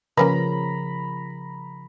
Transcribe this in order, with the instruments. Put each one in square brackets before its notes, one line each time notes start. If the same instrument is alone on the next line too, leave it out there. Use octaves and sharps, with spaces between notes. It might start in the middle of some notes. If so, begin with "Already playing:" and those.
[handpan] C#3 F3 A#4 [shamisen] A#3 C#4 B4 [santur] A#5 B5